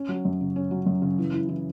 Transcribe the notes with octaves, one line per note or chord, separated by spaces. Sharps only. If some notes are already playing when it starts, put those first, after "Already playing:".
Already playing: C#4
F#3
F#2
C#3
C#4
F#3
F#2
C#3
E3
E4
E3